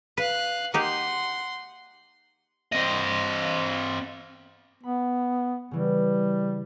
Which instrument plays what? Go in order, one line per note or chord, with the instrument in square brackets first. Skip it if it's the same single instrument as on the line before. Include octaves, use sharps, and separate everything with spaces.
[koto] B4 [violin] F5 F#6
[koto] A#3 D#4 G4 [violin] F#5 C6
[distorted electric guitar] C4 D#5
[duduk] B3 [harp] B5
[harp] C#3 E3 [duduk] G3